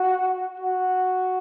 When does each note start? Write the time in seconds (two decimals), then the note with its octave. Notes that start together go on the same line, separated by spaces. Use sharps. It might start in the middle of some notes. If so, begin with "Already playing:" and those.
Already playing: F#4
0.60 F#4